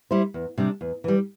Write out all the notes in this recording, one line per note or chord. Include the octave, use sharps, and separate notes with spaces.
G3 E4 C5
E2
C3 G3 D4
E2
E3 G3